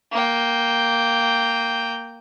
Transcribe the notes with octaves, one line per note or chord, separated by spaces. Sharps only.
A#3 G5